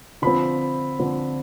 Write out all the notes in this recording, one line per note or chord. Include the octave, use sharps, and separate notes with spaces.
D3 F3 C4 B5
D3 F3 C4